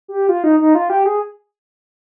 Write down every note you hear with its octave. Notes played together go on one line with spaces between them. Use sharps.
G4
F4
D#4
D#4
F4
G4
G#4